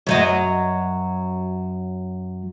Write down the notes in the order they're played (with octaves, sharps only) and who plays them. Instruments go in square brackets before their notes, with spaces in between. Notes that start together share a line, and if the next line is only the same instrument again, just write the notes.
[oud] F#2 F#3 D#5